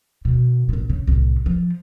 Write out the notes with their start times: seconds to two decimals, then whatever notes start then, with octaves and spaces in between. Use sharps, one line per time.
0.25 B2 D#3
0.69 A#1 A#2
0.90 C#3
1.07 C2 A2
1.46 F3